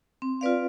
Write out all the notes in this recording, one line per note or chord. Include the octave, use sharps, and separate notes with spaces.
C4
F4 B4 D5 F5